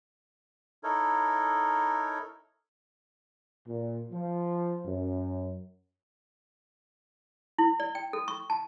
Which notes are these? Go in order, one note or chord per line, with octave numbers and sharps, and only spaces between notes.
D#4 E4 A4 A#4 C#5
A#2
F3
F#2
E4
D5
G5
A4
C#6
A5